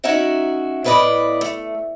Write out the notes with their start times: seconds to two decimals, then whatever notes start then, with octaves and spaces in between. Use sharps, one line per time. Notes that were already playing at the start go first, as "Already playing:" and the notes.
0.04 C#4 D#4 F#4 A#4 E5 F#5
0.84 A2 B3 B4 C5 D5 D#5
1.41 A3